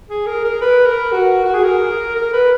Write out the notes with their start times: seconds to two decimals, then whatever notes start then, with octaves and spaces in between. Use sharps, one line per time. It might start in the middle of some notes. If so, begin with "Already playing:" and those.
0.10 G#4
0.26 A#4
0.44 A#4
0.61 B4
0.86 A#4
1.12 F#4
1.45 F#4
1.54 G#4
1.64 A#4
2.16 A#4
2.33 B4